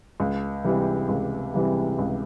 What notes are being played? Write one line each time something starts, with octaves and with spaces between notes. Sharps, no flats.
C#2
C3 E3 G3
C#2
C3 E3 G3
C#2